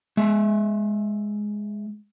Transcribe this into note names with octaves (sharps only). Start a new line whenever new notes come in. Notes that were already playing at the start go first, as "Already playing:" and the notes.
G#3 E5